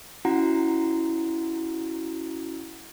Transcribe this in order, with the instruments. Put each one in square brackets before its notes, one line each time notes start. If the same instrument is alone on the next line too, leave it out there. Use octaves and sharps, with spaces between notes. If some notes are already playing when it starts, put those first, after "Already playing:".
[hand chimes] C#4 E4 F#4 F#5 A#5